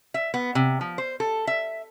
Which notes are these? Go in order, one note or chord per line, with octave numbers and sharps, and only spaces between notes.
E5
B3
C3
F3
C5
A4
E5